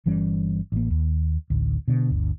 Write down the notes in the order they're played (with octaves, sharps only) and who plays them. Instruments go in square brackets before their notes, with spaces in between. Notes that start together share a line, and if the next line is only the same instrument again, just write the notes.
[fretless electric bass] G1 E3 G3 C#4
A1 A#3
D#2
A1 D2
B2 D3
G1 D2